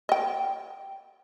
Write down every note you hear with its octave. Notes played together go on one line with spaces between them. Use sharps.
D#5 G5